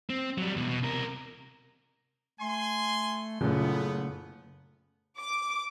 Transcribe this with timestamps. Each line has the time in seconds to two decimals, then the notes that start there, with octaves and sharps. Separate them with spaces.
0.10 C4
0.38 F#3 G3
0.56 E2 B2
0.69 B2
0.83 C3 A#4
2.40 A3 G#5 C6
3.41 F#1 A#2 C#3 A3 B3
5.18 D6